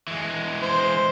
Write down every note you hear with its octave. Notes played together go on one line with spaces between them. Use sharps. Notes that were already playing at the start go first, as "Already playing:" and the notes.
E3 G#3
C5